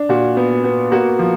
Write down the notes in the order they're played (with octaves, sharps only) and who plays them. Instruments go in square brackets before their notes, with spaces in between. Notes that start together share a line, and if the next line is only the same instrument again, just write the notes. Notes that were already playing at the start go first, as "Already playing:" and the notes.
Already playing: [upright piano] D4
A#2 F#4
B3
B3
A#3 F#4
F3